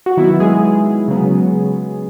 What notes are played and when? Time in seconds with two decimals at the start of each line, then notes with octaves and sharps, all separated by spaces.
0.06 F#4
0.17 D#3 F#3 B3 E4
0.40 G#3 G#4
1.08 C#3 F#3 B3